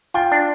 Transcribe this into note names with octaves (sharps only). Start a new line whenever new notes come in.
F4 G5
D4